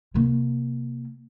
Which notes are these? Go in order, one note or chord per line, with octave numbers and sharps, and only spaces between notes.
C3 A#3